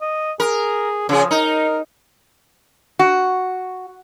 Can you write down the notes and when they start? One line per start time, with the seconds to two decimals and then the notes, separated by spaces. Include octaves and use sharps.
0.01 D#5
0.40 G#4 A#4
1.09 C#3 F3 G#4
1.31 D#4 A#4
2.99 F#4